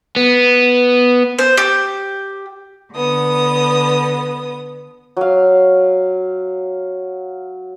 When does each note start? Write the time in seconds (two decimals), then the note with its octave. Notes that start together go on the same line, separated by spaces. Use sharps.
0.16 B3
1.39 C5
1.57 G4
2.94 D3 B3 D#6
5.17 F#3 F5